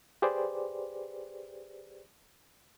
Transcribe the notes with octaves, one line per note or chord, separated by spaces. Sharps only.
G4 G#4 B4 C5 D5